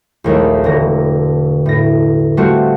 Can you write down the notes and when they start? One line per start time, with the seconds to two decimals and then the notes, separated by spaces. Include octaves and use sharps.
0.24 A#1 D#2 G#3 A3
0.64 E1 D3 A#6
1.66 A2 A#6
2.37 G3 A3 C4 F4 F#4